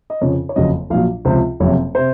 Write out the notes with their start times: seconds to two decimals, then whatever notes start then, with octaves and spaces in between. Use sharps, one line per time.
0.10 D#5
0.21 F2 C#3 F3 C#5
0.49 C#5
0.56 F#1 F2 C#3 F#3 D#5
0.90 A#1 A#2 F#3 F5
1.25 C#2 C3 F3 C5
1.60 F#1 F2 C3 C#5
1.95 C3 C5